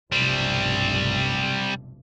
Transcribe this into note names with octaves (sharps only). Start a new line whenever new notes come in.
F1 B1 G2 G3 C4